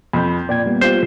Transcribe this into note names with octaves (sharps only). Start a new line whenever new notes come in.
F2 B5 G6
A#2 D5 G5 G#6
G3 A#3 B3
F4 G4 C5